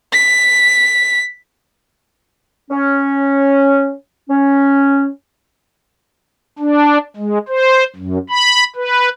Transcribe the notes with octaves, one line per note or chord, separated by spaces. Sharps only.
B6
C#4
C#4
D4
G#3
C5
F#2
B5
B4